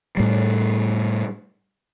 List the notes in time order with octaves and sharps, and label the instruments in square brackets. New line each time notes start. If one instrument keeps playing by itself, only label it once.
[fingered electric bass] A2 G3